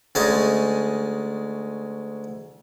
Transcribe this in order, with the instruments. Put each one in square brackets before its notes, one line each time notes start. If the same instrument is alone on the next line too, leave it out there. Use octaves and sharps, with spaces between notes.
[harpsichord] D2 G#3 C#4 D#5 G#5 A5